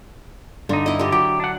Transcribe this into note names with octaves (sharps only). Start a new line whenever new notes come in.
G2 D3 D#4
E4 D#5
D3 G4
F#3 G4
D4 F#5